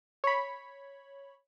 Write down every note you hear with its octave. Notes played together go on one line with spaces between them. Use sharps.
C#5 B5